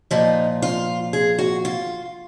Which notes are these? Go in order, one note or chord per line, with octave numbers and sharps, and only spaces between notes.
A#2 F3 D#4
F4
G#4
F#4
F4